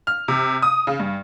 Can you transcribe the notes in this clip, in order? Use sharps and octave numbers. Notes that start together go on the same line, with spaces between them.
F6
C3
D#6
C#3
G2